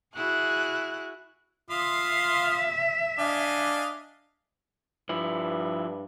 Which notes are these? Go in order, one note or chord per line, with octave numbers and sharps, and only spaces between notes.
E4 F#4 G#4 F#6
F4 E5 F5 C6 D#6
D4 D#5 F5 G#5
G2 F3 E4